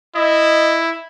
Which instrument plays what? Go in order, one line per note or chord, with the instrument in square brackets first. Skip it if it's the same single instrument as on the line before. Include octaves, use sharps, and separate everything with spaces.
[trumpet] E4 [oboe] D#5